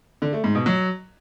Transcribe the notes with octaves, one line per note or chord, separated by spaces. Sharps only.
D3
A3
G#2
B2
F#3